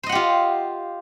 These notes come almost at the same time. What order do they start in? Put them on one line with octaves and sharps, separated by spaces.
C5 D#5 F#5 G4 F4